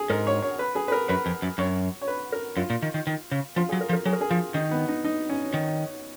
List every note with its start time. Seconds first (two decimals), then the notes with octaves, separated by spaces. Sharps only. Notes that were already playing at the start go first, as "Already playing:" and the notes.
Already playing: G#4
0.10 G#2 A#4
0.27 C#5
0.42 C#5
0.59 B4
0.75 G#4
0.88 B4
0.92 A#4
1.09 F#2 B4
1.26 F2
1.42 F#2
1.58 F#2 C#5
2.01 C#5
2.08 B4
2.32 A#4
2.57 F#2 F4
2.70 A#2
2.82 D#3
2.94 D#3
3.07 D#3
3.32 C#3
3.56 F3 F4
3.69 F#3 G#4
3.81 A#4
3.89 F3
3.93 A#4
4.05 F#3 G#4
4.13 A#4
4.21 G#4
4.30 F3 F4
4.54 D#3 D#4
4.71 B3
4.88 D#4
5.04 D#4
5.29 C#4
5.54 D#3